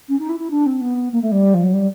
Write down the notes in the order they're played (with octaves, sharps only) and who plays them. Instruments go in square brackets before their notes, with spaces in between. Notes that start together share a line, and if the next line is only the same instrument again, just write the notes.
[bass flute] C#4
D#4
E4
E4
D4
C4
B3
A#3
A3
G3
F3
F#3
G3